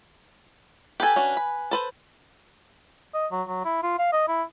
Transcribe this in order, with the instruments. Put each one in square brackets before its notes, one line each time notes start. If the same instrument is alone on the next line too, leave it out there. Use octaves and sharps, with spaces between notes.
[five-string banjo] G4 A4 [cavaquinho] B4 G#5
[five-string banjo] C#4 D4 F#4
B5
A4 B4 C5
[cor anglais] D#5
F#3
F#3
E4
F4
F5
D#5
E4